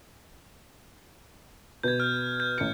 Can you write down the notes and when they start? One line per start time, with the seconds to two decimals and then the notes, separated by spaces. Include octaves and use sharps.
1.83 B2 B4 G6 G#6
2.00 F6 G6
2.40 G6
2.58 A1 C#7